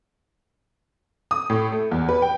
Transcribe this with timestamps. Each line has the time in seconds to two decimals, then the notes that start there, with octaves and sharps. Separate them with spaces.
1.31 D#6
1.50 A2
1.72 A3
1.91 E2
2.09 B4
2.22 G5